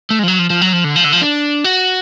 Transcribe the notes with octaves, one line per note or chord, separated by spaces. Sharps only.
A3
G#3
F3
F#3
F3
F3
F#3
F3
D3
F3
D3
F3
D4
F#4